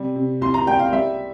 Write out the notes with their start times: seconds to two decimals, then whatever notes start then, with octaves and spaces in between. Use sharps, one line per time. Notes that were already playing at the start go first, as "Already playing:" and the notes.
Already playing: C3 G3
0.15 C3
0.41 C2 C6
0.54 A#5
0.67 G3 G5
0.79 F5
0.92 G3 E5